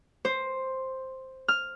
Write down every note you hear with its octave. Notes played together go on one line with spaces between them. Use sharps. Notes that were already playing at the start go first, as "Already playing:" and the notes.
C5
F6